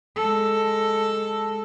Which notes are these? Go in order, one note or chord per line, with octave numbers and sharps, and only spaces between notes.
G#3 A4